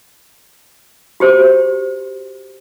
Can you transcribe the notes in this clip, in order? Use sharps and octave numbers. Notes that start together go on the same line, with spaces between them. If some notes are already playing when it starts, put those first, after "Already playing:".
F#4 G4 C5